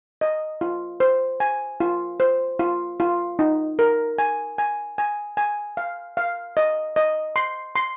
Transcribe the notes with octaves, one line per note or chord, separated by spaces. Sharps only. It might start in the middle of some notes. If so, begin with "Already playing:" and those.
D#5
F4
C5
G#5
F4
C5
F4
F4
D#4
A#4
G#5
G#5
G#5
G#5
F5
F5
D#5
D#5
C6
C6